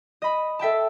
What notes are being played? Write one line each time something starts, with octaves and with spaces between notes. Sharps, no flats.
D#5 B5
A4 E5 G5 A5